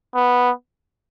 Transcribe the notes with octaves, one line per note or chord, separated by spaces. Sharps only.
B3